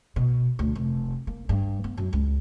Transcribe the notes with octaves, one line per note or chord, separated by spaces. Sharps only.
B2
D2
F1
A#3
G2
B3
F#2
C#2